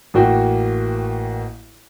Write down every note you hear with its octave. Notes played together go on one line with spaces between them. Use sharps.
A1 A#3 F#4 G5